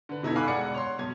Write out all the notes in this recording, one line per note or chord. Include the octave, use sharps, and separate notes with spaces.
D3 B4
B2 D#4 E4 A4 G#6
F5 G#5 B5 D6 E6 F#6
E1 G#3 D5 F#5 C#7
C#5 C6
B1 G#6